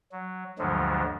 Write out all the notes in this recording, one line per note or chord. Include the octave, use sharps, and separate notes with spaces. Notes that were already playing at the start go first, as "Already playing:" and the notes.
F#3
D2 G2 D3 F3 F#3 G#3